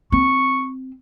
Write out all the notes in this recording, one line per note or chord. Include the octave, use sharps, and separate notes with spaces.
C4 C#6